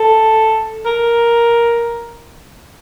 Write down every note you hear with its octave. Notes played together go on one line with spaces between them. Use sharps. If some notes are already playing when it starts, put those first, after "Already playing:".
Already playing: A4
A#4